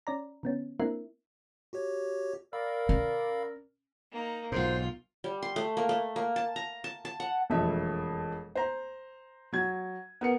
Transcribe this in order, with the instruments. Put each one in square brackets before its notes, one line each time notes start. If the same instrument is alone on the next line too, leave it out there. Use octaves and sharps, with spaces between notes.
[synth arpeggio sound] C#4 D5 A#5
D3 B3 C#4
A#3 C4 D4 E4 A#4 E5
[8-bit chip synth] F#4 G4 C#5
[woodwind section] A#4 D5 [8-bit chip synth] F5 B5 E6
[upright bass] C#4
[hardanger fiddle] A#3 D#4
[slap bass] B1 G#2 [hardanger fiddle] F4 [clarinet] C5
[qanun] G3
C6
A3
A#3
A3
A#3
A5
A#5
A5
A5
F#5
[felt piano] E1 F2 A3 E5
C5 A#5
F#3 G#6
B3 A#4 C#7